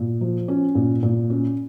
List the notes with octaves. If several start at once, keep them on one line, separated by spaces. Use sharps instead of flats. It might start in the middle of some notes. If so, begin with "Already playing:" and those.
Already playing: A#2
F3
C#4
A#2
A#2
C#4